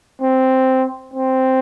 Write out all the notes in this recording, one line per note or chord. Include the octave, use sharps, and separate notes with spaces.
C4
C4